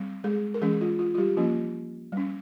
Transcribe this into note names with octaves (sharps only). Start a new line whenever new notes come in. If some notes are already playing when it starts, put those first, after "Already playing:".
Already playing: G3 C4
G#3 G#4
A#4
E3 G#3 C#4 G#4
F4
F4
F4
G3 G4
F3 A#3 C#4 F4
G3 C#4